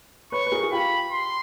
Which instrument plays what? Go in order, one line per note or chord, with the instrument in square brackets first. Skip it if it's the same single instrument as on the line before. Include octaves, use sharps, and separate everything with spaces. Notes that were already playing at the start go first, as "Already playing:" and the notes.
[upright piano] B4 C#5 [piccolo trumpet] C#6
[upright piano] B4
G#4 A#4
G#4
[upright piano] F4 G4 [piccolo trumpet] B5
[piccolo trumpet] C6